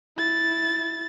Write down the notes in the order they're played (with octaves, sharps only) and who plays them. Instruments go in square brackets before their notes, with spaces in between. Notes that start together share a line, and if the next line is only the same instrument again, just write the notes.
[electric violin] E4 A6